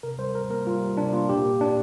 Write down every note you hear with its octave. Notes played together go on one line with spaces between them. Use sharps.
C3 A#4
G3 C5
G3 A#4
A#3 A#4
G3 F4
G3
C3 D4
A#3 F4
A#2 G4
A#3
A#2 D4